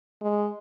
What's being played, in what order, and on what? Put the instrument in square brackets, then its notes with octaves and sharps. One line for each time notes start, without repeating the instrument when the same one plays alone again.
[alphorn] G#3